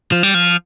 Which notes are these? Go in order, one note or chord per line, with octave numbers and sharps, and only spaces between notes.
F3
G3
F3